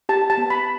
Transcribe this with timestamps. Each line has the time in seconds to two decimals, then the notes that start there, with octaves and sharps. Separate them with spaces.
0.09 G4 A5
0.30 A5
0.38 B3
0.50 B5